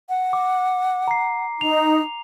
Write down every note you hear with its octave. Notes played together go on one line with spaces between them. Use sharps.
F#5
D6
A#5 C7
D#4 F7